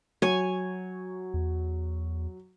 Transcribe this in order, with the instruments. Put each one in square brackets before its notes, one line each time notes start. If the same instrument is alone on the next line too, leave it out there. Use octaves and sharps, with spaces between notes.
[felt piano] F#3 [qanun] C#5 G#5
[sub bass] E2